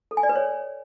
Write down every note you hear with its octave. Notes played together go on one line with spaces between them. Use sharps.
A4
G#5
D5
B4
C#5